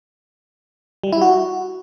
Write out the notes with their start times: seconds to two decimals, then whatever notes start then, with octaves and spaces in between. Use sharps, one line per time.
1.04 G3
1.13 E4
1.22 F#4